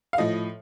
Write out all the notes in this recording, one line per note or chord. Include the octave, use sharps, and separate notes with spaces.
F5
A2 F3 D#5